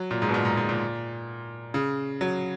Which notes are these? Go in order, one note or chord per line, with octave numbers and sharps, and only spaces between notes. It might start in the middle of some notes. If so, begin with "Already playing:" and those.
Already playing: F#3
A#2
G#2
B2
A#2
G#2
G#2
A#2
C#3
F#3